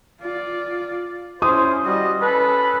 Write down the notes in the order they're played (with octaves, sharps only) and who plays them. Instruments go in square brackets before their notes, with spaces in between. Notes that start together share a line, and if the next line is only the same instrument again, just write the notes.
[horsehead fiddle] F4 D5
[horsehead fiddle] C#4 E4 [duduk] C5 [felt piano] D#6
[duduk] G3 [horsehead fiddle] F#4 D#5
[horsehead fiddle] C#4 A4 [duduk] B4